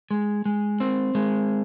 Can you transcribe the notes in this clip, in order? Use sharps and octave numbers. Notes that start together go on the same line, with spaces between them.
G#3
G#3
C4
G#3